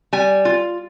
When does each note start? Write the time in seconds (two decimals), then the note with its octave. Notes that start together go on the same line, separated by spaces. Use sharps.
0.13 G3 G#5
0.45 F4